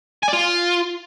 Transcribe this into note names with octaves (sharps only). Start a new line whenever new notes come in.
G#5
D5
F4